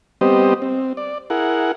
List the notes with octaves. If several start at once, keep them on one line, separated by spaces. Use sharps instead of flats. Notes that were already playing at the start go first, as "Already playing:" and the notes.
G3 B3 C4 G4 C5 D#5
C4
D5
E4 G#4 A#4 F#5